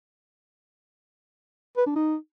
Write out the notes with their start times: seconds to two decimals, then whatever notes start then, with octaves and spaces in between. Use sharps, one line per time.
1.77 B4
1.87 D4
1.96 D#4